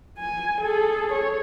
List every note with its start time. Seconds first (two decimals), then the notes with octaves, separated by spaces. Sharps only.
0.19 G#5
0.61 G#4 A4
1.13 C#5